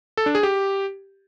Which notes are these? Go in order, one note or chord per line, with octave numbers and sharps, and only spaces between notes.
A4
D4
G#4
G4